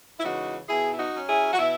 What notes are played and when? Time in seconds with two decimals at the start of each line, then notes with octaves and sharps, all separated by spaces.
0.19 E4
0.24 C#3 E3 G#3 D#4 F#4
0.69 B2 E4 G#4
0.94 E4
0.98 D#4 F#4
1.14 F#3 C#4
1.28 E4 G#4
1.53 F#4
1.59 B2 E4